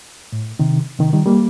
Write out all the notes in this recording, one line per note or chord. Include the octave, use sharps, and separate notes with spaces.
A2
C3 D#3
C3 D#3
D#3 G3
G3 A#3